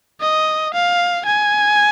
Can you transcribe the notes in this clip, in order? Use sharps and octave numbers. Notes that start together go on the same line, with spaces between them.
D#5
F5
G#5